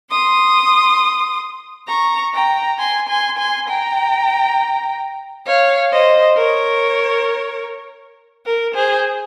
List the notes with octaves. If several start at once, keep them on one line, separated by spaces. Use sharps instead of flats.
C6 D#6
A#5 C#6
G5 A#5
G#5 C6
G#5 C6
G#5 C6
G5 A#5
C#5 F5
C5 D#5
A#4 C#5
A#4
G#4 C5